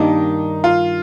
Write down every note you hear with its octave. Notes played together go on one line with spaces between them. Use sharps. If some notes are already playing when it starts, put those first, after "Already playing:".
Already playing: G2 D#3 A#3 D4 D#4 G4
F4